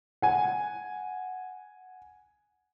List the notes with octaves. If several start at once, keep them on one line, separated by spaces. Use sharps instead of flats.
F#5 G#5